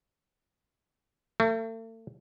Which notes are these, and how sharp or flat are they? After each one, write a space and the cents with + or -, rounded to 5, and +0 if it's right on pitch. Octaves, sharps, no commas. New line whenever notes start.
A3 +40